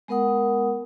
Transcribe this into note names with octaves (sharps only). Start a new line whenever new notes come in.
G#3 B3 A#4 F#5 D#6